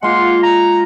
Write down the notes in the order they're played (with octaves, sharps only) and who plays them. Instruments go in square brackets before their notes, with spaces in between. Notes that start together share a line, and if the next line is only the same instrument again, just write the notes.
[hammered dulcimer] G#3 F4 [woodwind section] A#3 F#5 C6
[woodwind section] A#5